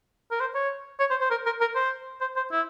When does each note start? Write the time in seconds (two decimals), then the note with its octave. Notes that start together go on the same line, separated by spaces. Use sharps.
0.31 A#4
0.40 C5
0.55 C#5
1.00 C#5
1.10 C5
1.21 C5
1.30 A#4
1.46 A#4
1.61 A#4
1.75 C5
2.21 C5
2.36 C5
2.52 E4